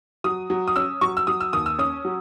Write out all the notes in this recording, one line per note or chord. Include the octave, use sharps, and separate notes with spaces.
F#3 D#6
F#3
D#6
C#4 E6
F#3 C#6
E6
F#3 D#6
E6
D#2 D#6
E6
C#4 D#6
F#3